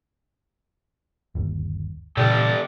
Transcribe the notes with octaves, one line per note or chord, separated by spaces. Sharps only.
G1 D#2
A#2 C#3 E3 A4 D5 G5